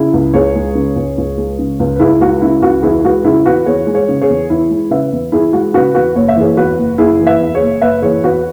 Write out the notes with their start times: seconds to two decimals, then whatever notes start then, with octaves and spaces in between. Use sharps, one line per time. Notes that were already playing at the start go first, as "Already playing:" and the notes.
Already playing: C#3 E4 G#4
0.13 C#2
0.34 C#2 G#4 C#5
0.55 G#3
0.75 C#3
0.96 C#2
1.18 C#2
1.38 G#3
1.59 C#3
1.80 C#2
1.96 B4
2.00 C#2 E4 G#4
2.21 G#3 F#4
2.42 C#3 E4
2.62 C#2 F#4
2.83 E2 E4 G#4
3.04 G#3 F#4 B4
3.24 C#3 E4 G#4
3.46 E2 F#4 B4
3.66 E2 G#4 C#5
3.87 G#3
3.94 G#4 C#5
4.09 C#3
4.22 G#4 C#5
4.29 E2
4.50 E2 E4
4.70 G#3
4.91 C#3 B4 E5
5.12 E2
5.32 E2 E4 G#4
5.53 G#3 F#4
5.74 C#3 F#4 B4
5.95 E2 F#4 B4
6.15 F#1 C#5
6.28 E5
6.36 E3 G#4 C#5
6.57 E2 F#4 B4
6.78 F#1
6.98 F#1 E4 G#4
7.20 E3
7.26 B4 E5
7.40 E2
7.55 G#4 C#5
7.62 F#1
7.82 F#1 B4 E5
8.02 E3 G#4 C#5
8.23 E2 F#4 B4